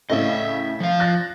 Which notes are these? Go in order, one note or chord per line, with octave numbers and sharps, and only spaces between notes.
A2 C#3 A3 D#5 E5
F3 F5
F#6 A6 A#6